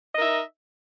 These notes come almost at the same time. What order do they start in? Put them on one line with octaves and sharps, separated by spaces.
D#5 A#4 D#4 E5